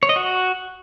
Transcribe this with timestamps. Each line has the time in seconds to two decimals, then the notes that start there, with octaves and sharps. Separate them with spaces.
0.03 C#5
0.09 D#5
0.16 F#4